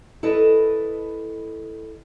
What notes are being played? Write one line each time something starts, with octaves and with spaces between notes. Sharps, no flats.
E4 A4 B4 D#5